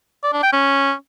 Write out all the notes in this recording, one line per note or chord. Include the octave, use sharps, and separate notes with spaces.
D5
D4
G5
C#4